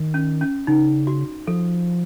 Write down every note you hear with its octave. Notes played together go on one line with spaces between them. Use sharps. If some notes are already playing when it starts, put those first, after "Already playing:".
Already playing: D#3
C#4
C#4
C#3 D#4
F#4
F3 A4